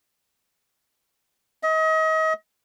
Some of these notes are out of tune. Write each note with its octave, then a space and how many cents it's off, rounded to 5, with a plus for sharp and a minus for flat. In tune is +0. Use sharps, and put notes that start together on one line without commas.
D#5 +35